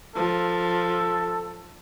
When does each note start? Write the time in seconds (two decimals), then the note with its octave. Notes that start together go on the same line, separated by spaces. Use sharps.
0.16 F3 A4